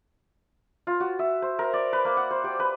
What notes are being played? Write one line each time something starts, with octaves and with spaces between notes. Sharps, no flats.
F4
F#4
E5
C5
A#4
D5
B4
A#3
F#5
C5
G4
B4